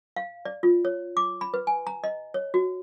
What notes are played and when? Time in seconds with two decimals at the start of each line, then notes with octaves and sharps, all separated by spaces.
0.16 F5
0.45 D5
0.63 F4
0.85 C#5
1.17 D6
1.41 B5
1.54 B4
1.67 G#5
1.87 A#5
2.04 D#5
2.34 C#5
2.54 F#4